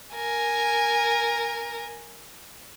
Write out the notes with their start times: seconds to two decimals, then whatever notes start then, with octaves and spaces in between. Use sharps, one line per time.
0.14 A#4 G#5